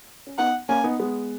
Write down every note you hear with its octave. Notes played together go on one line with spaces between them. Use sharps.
C#4
B3 D#4 F#5
A#3 C#4 G#5
B3 D#4
G#3 B3